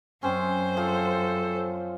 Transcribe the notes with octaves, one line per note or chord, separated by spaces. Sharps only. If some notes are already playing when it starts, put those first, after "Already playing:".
F#2 C4 C#4 C5
F3 A4